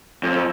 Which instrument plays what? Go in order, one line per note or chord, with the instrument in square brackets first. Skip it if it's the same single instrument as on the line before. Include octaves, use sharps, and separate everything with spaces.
[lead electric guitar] F2